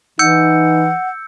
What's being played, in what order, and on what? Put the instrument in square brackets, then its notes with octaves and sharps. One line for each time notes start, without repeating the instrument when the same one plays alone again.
[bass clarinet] E3 [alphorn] D#4 [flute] F#5 [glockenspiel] E6 G6 C#7